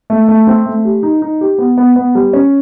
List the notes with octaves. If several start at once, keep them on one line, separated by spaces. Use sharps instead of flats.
A3
A3
C4
A3
G4
D#4
D#4
G4
B3
B3
B3
G3
C#4